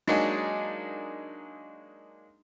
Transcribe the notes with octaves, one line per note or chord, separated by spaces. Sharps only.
F#3 G#3 A#3 D4 D#4 G#4